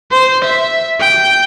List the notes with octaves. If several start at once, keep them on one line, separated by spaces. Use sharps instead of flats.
C5
E5
G5